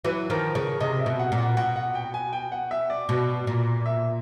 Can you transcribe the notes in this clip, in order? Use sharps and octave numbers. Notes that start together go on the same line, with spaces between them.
E3 F#3 B4
D#3 F3 A#4
C#3 A#4
C3 D#5
E5
B2
F#5
A#2
F#5
B2 F#5
F#5
G5
G#5
G5
F#5
E5
D5
B2
A#2
E5